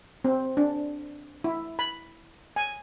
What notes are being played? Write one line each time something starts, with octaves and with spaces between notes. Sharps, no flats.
C4
D4
E4
B5
G#5